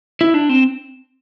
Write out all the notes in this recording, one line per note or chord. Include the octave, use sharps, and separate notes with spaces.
E4
D4
C4